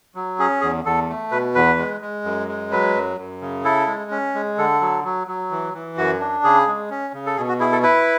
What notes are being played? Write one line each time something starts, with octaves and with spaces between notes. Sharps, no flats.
F#3
C#4 G#4
E2 G#4
E2 A4
A3
B2 B4
E2 B4
G#3
G#3
F#2
G#3
F#3 B4
F#2
F#2
C#3
E4 A4
G#3
C#4
G#3
D3 A4
F#3
F#3
F#3
E3
E3
F#2 F#4
D4
C#3 G#4
G#3
C#4
C#3
A4
B2 G#4
F#4
E4 G#4
A4
E4 B4